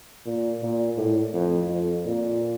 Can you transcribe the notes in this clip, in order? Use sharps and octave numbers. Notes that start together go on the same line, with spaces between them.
A#2
A#2
A2
F2
F2
A#2